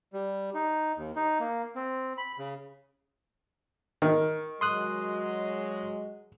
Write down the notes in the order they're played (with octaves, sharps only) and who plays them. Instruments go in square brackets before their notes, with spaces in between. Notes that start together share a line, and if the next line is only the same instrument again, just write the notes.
[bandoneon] G3
D#4
D#2
D#4
A#3
C4
B5
C#3
[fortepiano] D#3
[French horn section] F#3 G#3 [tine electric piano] C6 D#6 F#6